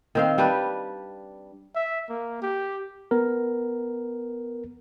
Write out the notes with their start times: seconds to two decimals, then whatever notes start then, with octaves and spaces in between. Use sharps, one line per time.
0.15 D#3 C4 F5
0.38 G3 D4 G4 B4
1.75 E5
2.09 A#3
2.42 G4
3.11 B3 A#4